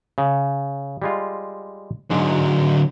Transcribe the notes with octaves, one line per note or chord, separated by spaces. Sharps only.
C#3
G3 G#3 F4
G#2 D3 F#3